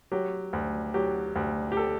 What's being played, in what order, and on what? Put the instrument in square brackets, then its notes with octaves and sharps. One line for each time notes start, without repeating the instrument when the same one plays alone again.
[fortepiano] F#3 G4
D2
F#3 G4
D2
G4
A4